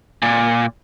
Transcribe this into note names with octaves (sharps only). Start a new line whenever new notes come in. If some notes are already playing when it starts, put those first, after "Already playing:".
A#2